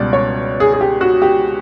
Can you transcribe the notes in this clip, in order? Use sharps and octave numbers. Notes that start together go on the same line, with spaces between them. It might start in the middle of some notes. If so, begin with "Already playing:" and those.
Already playing: C#2 B2 G3 D5
C#5
G#4
G#4
G4
F#4
G4